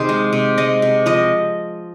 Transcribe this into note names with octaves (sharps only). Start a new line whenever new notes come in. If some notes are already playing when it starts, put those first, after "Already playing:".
Already playing: C3 D#3 G#4 C5
G#3
C3
G#3 D#5
C3
F3 D#5